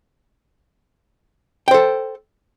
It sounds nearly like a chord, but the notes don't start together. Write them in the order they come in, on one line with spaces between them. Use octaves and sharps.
G5 C5 A4